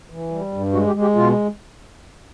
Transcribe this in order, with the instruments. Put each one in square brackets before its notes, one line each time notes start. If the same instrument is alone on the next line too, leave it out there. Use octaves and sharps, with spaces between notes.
[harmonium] E3
G3
G2
G#3 F#4
G4
G#3
G4
B2 F4